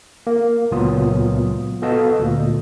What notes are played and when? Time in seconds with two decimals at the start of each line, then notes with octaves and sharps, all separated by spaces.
0.27 A#3
0.71 C#2 A#2 F#3 B3 F4 D#6
1.82 B3 F#4 A4 D#5 F5 A5
2.19 D2 A#2